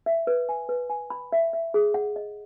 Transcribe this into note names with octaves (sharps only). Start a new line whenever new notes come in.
E5
B4
G#5
B4
G#5
B5
E5
E5
G#4
F#5
D#5